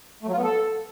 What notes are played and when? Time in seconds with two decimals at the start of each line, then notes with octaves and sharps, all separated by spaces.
0.23 A3
0.28 F#3
0.33 F4
0.38 B3
0.43 A4